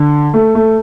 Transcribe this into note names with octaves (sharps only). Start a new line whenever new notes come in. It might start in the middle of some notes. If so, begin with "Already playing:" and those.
Already playing: D3
A3
A3